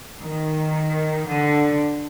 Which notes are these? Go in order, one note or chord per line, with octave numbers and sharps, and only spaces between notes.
D#3
D3